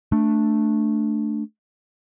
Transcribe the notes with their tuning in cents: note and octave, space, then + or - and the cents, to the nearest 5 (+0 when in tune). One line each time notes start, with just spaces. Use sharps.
A3 +0 D4 +0